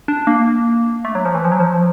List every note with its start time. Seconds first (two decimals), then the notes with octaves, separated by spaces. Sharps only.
0.08 D4
0.27 A#3
1.05 A3
1.15 F#3
1.25 F3
1.35 E3
1.45 F3
1.52 F#3
1.60 F3